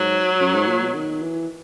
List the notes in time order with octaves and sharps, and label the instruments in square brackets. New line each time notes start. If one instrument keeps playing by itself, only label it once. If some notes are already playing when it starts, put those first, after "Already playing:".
Already playing: [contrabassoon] G#2 [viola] F#3
[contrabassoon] F#2
G#2
A#2
B2
D#3
E3